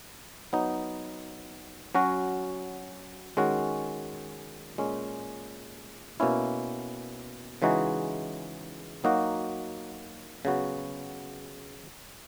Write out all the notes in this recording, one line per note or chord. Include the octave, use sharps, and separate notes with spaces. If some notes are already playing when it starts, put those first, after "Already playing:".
F#3 B3 D#4
F#3 C#4 F#4
D#3 G#3 C#4 F#4
A#2 G#3 C#4
B2 A#3 C#4 E4
C#3 E3 G#3 D#4 F#4
F#3 A#3 D#4 F#4
C#3 F#3 B3 F#4